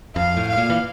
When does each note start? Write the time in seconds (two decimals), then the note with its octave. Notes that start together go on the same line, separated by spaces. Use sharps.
0.16 F2 F5
0.37 A2
0.48 F5
0.58 A#2
0.70 E3